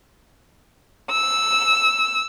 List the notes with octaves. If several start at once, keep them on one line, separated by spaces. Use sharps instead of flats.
E6